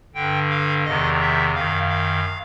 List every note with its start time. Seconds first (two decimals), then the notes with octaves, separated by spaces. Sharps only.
0.14 G2 D3 G5
0.50 F5
0.85 E2 C3 D#3 D#5
1.20 E5
1.54 F#2 D#3 F5
1.89 F5